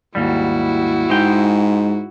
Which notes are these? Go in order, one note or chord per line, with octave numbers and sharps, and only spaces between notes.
D#2 G#2 G3 E4 F#4
G#2 G#3 G5